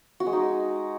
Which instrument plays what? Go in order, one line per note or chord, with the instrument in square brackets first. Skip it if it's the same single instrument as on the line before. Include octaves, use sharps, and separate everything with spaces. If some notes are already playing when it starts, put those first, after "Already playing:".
[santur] F#4
G#3
D#4